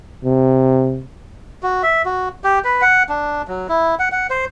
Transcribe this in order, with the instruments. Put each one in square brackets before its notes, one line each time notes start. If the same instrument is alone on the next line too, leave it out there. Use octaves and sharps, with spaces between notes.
[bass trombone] C3
[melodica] F#4
E5
F#4
G4
B4
F#5
D4
F#3
E4
F#5
F#5
C5